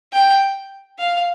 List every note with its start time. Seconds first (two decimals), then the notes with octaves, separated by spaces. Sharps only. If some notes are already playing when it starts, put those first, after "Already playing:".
0.13 G5
0.99 F5